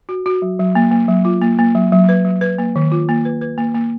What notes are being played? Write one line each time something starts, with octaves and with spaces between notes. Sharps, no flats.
F#4
F#4
F#3
F#3
A#3
A#3
F#3
F4
A#3
A#3
F#3
F#3
B4
F#3
B4
A#3
D#3
F4
A#3
B4
B4
A#3
A#3